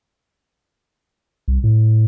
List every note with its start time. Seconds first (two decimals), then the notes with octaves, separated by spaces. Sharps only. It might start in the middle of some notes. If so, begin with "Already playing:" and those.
1.48 C2
1.64 A2